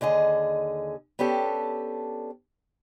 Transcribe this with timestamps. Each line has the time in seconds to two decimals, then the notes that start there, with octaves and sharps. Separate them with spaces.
0.01 D#2 D3 G#4 D#5
1.19 B3 C#4 D4 G4 A4